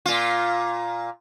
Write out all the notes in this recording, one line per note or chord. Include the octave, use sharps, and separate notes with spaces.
A#2 F4